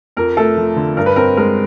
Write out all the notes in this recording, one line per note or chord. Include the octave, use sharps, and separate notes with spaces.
F2 A#4
A3 A4
F3
D3
G2 A#4
B4
C4 A#4
G#3 A#4